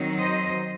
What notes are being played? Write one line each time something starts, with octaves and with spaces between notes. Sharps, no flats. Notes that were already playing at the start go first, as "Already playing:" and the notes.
Already playing: D#3 F#3 C4 D#4
C5 D#5